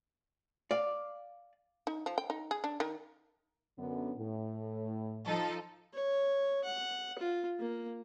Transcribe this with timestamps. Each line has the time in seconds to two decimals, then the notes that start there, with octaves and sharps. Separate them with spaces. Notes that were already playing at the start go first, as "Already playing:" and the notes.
0.71 D5 F5
1.87 D#4
2.06 F3
2.18 G5
2.30 D#4
2.51 G#4
2.64 D4
2.80 D#3
3.78 F#2 D3 B3
4.18 A2
5.26 F3 D#4 A4
5.93 C#5
6.64 F#5
7.18 F4
7.60 A#3